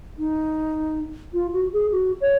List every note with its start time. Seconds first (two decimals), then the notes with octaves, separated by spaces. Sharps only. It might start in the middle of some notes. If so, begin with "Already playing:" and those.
0.18 D#4
1.33 F4
1.53 F#4
1.73 G#4
1.91 F#4
2.21 C#5